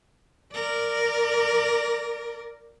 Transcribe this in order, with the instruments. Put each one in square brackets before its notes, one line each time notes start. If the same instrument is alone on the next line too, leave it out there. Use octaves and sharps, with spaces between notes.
[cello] A#4 D5